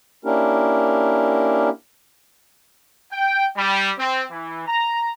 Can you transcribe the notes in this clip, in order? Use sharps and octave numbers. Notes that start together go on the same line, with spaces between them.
A#3 C#4 D4 E4 G4 A#4
G5
G3
C4
E3
A#5